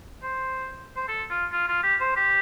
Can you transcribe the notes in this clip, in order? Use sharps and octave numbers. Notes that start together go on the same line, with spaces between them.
C5
C5
A4
F4
F4
F4
G4
C5
G4